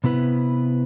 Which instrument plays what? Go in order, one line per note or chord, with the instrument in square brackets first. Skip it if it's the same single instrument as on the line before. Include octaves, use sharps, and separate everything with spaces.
[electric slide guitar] C3 B3 E4 B4